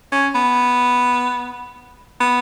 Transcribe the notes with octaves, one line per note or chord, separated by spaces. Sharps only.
C#4
B3
B3